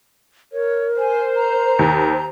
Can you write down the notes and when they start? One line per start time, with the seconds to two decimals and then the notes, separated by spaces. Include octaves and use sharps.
0.52 A#4 C#5
0.99 C5 G#5
1.36 A#5
1.79 D#2